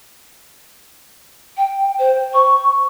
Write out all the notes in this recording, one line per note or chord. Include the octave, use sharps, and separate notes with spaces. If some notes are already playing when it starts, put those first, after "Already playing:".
G5
C5
C#6